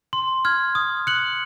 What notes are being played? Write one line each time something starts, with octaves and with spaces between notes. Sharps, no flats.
C6
F6 G#6
D#6
F#6 C#7 F#7